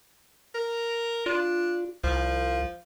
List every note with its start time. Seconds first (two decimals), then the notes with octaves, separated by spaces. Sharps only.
0.54 A#4
1.26 D4 F4
2.04 C2 F3